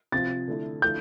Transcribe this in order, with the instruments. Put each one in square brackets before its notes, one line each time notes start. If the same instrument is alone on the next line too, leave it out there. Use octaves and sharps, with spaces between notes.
[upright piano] C3 F3 C4 F4 [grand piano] A6
[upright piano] D3 A3 E4
[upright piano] D3 F3 A3 E4 [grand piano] G6